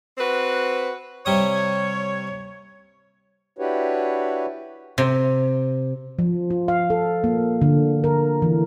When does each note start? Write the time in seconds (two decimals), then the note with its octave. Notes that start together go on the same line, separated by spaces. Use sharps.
0.18 C4 F#4 B4
1.26 C3 G3 C#5 D#6
3.59 D4 E4 F#4 G4 B4 C#5
4.98 C3
6.19 F3
6.50 F4
6.68 F5
6.90 A4
7.24 A#3
7.61 D3
8.04 A#4
8.42 E3